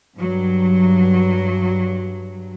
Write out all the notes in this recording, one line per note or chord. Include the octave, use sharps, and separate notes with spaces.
G2 F#3